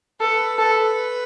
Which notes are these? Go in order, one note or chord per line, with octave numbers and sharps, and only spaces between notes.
A4 B4
A4